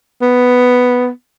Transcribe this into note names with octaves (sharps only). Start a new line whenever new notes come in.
B3